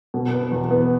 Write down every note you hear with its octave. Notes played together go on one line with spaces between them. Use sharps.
B2
B3
E2
B3